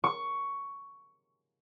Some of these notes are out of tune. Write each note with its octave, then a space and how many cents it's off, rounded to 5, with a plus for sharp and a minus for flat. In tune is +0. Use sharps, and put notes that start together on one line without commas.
C#6 +10